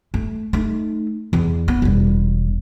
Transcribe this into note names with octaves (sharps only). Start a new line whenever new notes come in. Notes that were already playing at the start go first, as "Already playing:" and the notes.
A3
A3 D#4
E2
B3
E1 G3